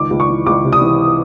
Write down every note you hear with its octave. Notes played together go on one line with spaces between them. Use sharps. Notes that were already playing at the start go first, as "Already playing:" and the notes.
Already playing: C#2 D#3 D6
C#2
C#6
E3
C#2 D6
C3
D#6
E3